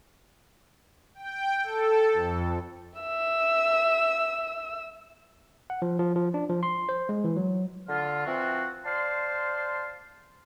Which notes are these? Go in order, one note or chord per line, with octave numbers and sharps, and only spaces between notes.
G5
A4
F2
E5 E6
F#5
F3
F3
F3
D4
F3
C6
C5
G#3
E3
F#3
D3 F4
E3 F3 C4 F4 F#4
C5 D5 F5 A5 C6